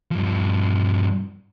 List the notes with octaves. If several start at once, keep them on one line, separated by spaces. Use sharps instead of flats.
G2 F3